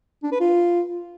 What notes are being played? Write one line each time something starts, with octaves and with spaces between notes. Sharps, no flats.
D4
B4
F4